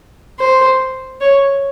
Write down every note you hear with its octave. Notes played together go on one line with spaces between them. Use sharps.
C5
C#5